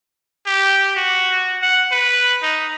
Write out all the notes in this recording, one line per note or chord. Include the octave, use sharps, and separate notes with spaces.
G4
F#4
F#5
B4
D#4